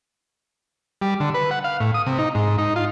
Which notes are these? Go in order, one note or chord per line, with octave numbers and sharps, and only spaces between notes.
G3
D3
B4
F#5
F5
A2
D#6
C3
D#4
G#2
D#4
F4